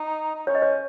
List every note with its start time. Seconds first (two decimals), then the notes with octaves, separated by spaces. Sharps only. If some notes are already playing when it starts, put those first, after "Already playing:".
Already playing: D#4
0.35 D#4
0.47 C#4 C#5
0.55 D#5
0.62 C#5